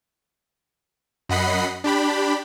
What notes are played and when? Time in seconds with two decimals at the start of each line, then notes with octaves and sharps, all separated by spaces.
1.29 F#2 D#5 F#5 B5 C7
1.84 D4 G4 B5